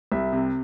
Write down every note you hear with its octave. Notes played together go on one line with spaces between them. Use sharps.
C2 E5
C3